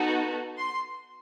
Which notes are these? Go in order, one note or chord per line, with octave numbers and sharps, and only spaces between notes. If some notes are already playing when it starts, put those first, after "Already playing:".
Already playing: B3 D#4 F#4 A4
C6